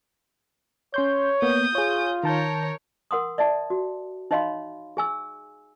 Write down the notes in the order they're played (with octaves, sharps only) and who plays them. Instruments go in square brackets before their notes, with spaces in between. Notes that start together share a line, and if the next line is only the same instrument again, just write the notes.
[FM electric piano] C#4 C6 G6 [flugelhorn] C#5
[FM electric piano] A#3 B3 [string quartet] D#6 G6
[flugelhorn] F4 [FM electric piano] G#4 C#5
[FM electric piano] D#3 A5 G6 [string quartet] A#4 C#5
[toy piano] A#4 F#5 C6 D#6
D5 E5 A5
F#4
D#4 C#5 D#5 F5 B5 C6
G#4 G#5 E6